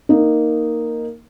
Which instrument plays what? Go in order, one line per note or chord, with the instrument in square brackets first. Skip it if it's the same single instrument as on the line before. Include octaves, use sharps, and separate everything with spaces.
[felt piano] A#3 D#4